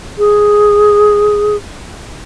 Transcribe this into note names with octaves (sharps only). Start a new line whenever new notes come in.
G#4